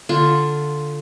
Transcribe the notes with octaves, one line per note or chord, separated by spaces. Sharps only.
D3 F4